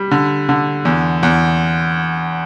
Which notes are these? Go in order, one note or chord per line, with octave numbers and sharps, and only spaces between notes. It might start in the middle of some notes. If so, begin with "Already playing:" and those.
Already playing: G3
D3
D3
E2
E2